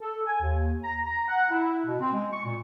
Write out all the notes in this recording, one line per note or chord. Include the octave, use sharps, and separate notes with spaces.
A4
G#5
D#2
A#5
A#5
F#5
E4
B2
C4
G#3
C#6
A#2